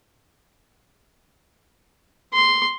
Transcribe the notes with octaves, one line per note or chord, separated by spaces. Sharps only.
C6